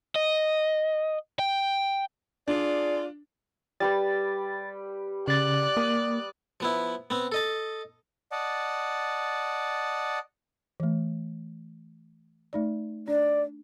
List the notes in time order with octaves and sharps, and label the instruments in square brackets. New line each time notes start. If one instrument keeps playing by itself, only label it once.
[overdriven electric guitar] D#5
G5
[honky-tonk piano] D4 [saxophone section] F4 G#4 D5
[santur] G3 G4 B4 [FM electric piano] A6
[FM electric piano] C#3 A6 [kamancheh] D5 F#6
[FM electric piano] A#3 [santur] D#6
[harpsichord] F3 B3 E4
B3 C4
A4 D#5 A5
[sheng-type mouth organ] D5 D#5 F#5 A5
[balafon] E3 A3
A3 D#4 D5
[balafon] D4 [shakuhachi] D5